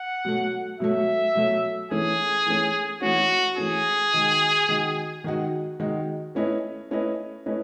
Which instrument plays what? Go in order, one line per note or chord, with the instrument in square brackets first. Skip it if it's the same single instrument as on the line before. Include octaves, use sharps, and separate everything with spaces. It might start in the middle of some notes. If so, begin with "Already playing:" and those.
Already playing: [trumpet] F#5
[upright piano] B2 F#3 A3
[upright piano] B2 F#3 A3 [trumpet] E5
[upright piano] B2 F#3 A3
[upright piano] E3 A3 C#4 [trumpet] G#4
[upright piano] E3 A3 C#4
[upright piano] E3 A3 C#4 [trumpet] F#4
[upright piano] E3 A3 C#4 [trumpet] G#4
[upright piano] D#3 G#3 D#4 F#4
D#3 G#3 D#4 F#4
D#3 G#3 D#4 F#4
D#3 G#3 D#4 F#4
A3 C#4 E4 B4 D#5
A3 C#4 E4 B4 D#5
A3 C#4 E4 B4 D#5